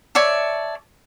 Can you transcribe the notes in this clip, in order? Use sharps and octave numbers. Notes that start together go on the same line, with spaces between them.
C#5 D5 E5 A5